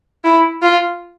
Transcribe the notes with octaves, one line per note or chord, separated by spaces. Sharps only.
E4
F4